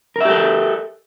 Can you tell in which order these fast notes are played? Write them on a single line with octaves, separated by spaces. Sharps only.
A#4 E5 G4 A4